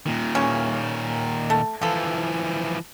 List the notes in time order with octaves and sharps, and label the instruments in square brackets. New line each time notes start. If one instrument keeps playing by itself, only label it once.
[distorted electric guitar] A#2 D#3
[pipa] C#3 E3 C#4
A3
[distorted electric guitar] E3 F3 [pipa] F4 A4